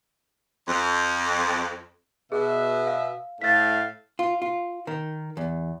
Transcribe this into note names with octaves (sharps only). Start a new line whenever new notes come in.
F2
B2 G#4 E5
F5
A2 A3 F5 A6 B6
F4
F4
D#3
E2